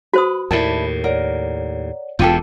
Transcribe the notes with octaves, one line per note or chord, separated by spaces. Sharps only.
F#4 B4 C5 D#6
D#2 A2 E4 A#4 D5 A5
A#4 C#5 D5 F#5
E1 E2 B2 F4 G4 A4 G6 D#7